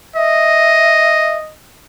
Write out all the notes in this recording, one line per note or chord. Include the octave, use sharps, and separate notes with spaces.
D#5 E5